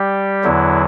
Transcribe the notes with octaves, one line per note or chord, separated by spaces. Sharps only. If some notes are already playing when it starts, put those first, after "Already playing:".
Already playing: G3 G4
E2 D3 F#3 E4